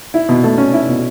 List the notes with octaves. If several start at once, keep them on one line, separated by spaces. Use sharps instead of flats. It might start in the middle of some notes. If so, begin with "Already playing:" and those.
E4
B2
A3
C#4
E4
B2